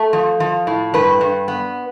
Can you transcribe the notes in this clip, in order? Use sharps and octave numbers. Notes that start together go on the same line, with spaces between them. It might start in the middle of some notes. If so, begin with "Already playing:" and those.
Already playing: A3
F3
F3
A2
G2 B4
G2
B3